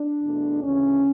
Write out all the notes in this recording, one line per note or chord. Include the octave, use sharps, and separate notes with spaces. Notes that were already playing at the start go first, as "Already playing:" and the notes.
Already playing: D4
E2 B2 A3
D2 C#3 E3 C#4